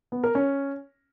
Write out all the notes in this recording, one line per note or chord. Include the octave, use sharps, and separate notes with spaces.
B3
A#4
C#4